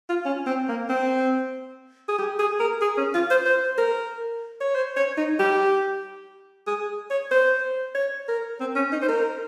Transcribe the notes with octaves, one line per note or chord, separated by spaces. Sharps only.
F4
C#4
C4
A#3
C4
G#4
G4
G#4
A#4
G#4
C#4
F4
C5
C5
A#4
C#5
C5
C#5
D#4
G4
G#4
C#5
C5
C#5
A#4
C4
C#4
D#4
C5
A#4